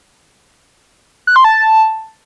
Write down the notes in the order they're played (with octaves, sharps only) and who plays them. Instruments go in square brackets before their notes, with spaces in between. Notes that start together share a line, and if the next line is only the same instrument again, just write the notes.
[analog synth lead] F#6
C6
A5